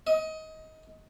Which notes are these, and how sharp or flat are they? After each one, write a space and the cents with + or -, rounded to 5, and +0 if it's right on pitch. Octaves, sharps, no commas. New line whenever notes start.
D#5 +20